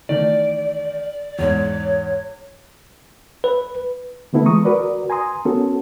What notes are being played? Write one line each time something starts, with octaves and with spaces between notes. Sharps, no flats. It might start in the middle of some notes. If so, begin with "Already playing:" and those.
D#3 E3 A3 D5
E2 G#2 C#5
B4
D3 A3 B3 E4 A4
E3 G#3 A#5 C#6 D#6
F#4 A#4 B4 D5
G#5 A#5 C6 D#6
B3 C#4 F#4 A4 A#4